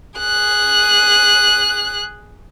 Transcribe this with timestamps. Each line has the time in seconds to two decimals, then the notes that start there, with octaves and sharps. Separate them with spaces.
0.19 G#4 F#6